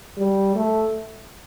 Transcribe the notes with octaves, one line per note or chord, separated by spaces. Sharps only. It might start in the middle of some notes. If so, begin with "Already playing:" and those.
G3
A3